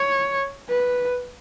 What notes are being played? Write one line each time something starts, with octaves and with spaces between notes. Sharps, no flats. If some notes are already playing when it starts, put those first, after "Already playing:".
Already playing: C#5
B4